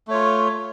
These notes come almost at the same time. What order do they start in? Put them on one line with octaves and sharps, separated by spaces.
A3 C#5 F4